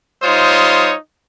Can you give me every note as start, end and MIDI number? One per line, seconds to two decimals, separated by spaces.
0.23 0.94 55
0.23 0.94 63
0.23 0.94 65
0.23 0.94 72
0.23 0.94 73
0.23 0.94 87